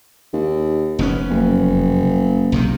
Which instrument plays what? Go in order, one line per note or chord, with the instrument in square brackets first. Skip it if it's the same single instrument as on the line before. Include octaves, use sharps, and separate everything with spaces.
[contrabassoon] D#2
[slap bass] F1 B3 C#4
[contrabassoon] F#1
[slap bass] B1 C3 D#3